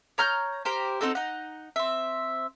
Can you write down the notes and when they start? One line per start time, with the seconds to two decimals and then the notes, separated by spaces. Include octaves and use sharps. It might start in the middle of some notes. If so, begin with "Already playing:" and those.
0.18 C#5 A#5 F6 G6
0.65 G4 A#4 C5
1.01 C4 D#4 F#4 A4
1.15 D#4 F#5
1.76 C4 E5